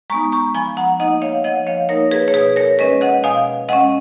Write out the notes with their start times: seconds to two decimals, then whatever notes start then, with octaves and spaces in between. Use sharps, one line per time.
0.10 G#3 B3 D#4 A#5 C#6
0.32 A#5 C#6
0.55 F3 G#5 B5
0.77 F#5 A#5
1.00 A#3 D#4 D#5 F#5
1.22 C#5 F5
1.44 F3 D#5 F#5
1.67 C#5 F5
1.89 A#3 D#4 A#4 C#5
2.11 G#4 B4
2.28 C#5
2.34 B2 G#4 B4
2.56 A#4 C#5
2.79 G#3 C#4 B4 D#5
3.01 D#5 F#5
3.24 B2 F5 G#5
3.69 G#3 C#4 D#5 F#5